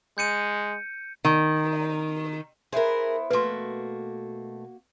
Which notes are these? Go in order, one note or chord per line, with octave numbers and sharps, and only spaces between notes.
G#3 G6 C#7 D#7
D#3
B3 E4 G#4 A#4 C5
B2 A3 A#3 F#4 B4 C6